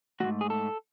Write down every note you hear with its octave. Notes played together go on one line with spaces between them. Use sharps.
G#2 D#3 A3 F#4
G#4
A4